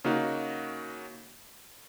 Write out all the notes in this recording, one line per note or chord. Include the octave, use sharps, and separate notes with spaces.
C#3 A#3 D#4 F#4